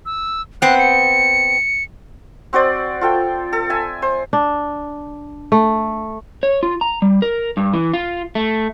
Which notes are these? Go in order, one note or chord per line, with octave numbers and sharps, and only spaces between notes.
E6
B3 C4 F#6
C#7
C4 F#4 C5 D5
F4 A4 G5
A4
E5 G#5
C5
D4
A3
C#5
F4
A#5
G3
A#4
G2
E3
F4
A3